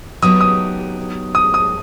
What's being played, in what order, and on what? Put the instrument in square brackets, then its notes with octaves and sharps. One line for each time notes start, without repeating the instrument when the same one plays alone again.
[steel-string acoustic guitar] F#3 B3 D#4 G4 [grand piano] D#6
[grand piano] D#6
D#6
D#6